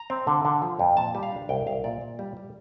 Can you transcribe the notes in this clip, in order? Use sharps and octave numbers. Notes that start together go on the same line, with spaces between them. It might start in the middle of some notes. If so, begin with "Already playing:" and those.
Already playing: A#5
C4
D3
D3
F3
F2
A#2 A5
G3
F5
D4
C2 G5
C2 F5
A#2 D5
A#2
G3
G3